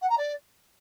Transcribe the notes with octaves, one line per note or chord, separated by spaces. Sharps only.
F#5
A#5
D5